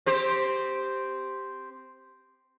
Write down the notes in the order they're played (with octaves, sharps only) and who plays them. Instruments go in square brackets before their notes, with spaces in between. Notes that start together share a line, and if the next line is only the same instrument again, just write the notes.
[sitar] C4 G4 C5